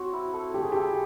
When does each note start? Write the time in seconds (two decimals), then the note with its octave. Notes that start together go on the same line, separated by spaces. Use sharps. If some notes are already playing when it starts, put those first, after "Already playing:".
Already playing: C4 F#4 C#5
0.13 E4
0.33 A4
0.54 A3 G4
0.63 G#4
0.72 G4 A4